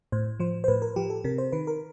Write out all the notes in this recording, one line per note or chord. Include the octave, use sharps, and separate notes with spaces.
A2 C5
F3 C5
C5
A2 B4
A#4
F3 G4
A4
C3 A#4
C5
D#3 B4
A#4